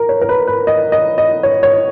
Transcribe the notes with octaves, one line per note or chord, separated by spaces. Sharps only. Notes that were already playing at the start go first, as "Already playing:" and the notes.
Already playing: A#4
C#5
A#4
B4
B4
D#5
D#5
D#5
C#5
C#5